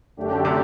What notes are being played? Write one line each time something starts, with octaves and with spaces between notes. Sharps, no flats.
F#2 D3 A3 D4 G4
C3